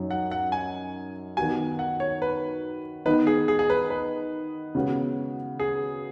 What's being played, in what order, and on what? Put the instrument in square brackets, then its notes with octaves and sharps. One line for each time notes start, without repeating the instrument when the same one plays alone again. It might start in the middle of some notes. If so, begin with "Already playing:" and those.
Already playing: [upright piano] F#2 F#3 D#4
[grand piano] F#5
F#5
G#5
[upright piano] D#3 B3 F#4 [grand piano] G#5
[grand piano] F#5
C#5
B4
[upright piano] D#3 B3 D#4 [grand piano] B4
[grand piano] G#4
G#4
G#4
B4
B4
[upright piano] C#3 G#3 B3 F#4
[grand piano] G#4